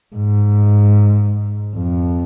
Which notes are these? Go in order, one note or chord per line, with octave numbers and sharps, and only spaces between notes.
G#2
F2